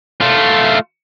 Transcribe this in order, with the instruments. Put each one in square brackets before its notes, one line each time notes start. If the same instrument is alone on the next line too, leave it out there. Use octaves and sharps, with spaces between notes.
[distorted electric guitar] A3 F4